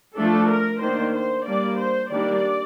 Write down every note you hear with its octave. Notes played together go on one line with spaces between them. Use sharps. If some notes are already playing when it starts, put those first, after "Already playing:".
F3 A3 D4 A4
A#4
D#3 A#3 D4 C5
C5
G3 A#3 D4 D5
C5
D#3 G3 A#3 D4 D5